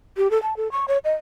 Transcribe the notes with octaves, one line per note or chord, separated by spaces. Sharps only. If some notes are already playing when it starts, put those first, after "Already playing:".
G4
A4
A5
A4
C#6
C#5
D#5